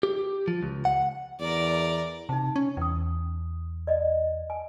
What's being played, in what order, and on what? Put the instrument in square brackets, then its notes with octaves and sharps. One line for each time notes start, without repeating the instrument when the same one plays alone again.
[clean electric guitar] G4
F3
C#2
F#5
[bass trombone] E2 [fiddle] A#4 D5
[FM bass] C3 [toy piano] D#4 A5
[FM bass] C#4
[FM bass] E2 [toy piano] G5 D#6
[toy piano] D5 D#5
G#5